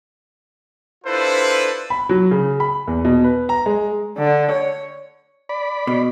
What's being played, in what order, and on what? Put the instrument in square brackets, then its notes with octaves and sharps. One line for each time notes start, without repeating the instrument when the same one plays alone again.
[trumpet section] D4 E4 F4 A4 B4 C5
[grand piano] B5
F#3
C#3
B5
E2
B2
B4
A#5
G#3
[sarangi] D3
C#5
[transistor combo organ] D5 B5
[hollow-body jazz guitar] B2